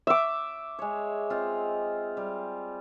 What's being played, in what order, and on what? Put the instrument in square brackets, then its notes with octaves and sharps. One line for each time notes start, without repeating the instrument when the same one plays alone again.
[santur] E5 D6
[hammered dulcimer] G#3 C#5
C4 F4 D#5
G3